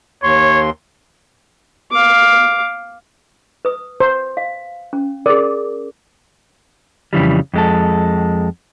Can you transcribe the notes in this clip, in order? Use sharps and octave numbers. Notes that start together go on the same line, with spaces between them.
D#2 C#5 C6
F5 D6
B4 D#6
C5
F5
C#4
G#4 A#4 D5
F2 C#3 E3 G3
F2 G#3 A4